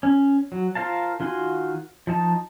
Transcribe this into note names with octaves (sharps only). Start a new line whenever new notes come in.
C#4
F#3
F4 A#4 C5 F5 A5
D#3 F4 F#4 G#5 C6
F3 D#4 A5